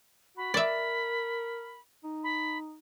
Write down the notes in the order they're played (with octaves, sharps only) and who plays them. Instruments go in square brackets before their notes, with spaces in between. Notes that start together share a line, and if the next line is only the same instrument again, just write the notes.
[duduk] F#4 [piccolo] B5
[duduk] A#4 [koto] D5 E5
[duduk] D#4
[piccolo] B5